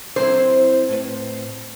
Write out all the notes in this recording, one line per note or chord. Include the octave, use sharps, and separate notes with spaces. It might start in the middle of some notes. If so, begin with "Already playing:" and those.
F#3 C4 E4 C5
A2 B4